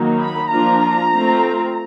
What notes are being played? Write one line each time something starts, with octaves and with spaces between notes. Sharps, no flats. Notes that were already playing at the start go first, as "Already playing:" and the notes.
Already playing: D#3 F#3 A#3 D#4
B5
F3 A#3 D4 F4 A#5
A3 C4 F4